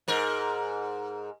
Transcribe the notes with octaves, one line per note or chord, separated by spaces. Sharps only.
G#2 A#4